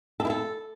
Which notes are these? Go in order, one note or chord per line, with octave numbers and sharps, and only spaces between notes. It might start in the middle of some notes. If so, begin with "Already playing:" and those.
A4
E4
A4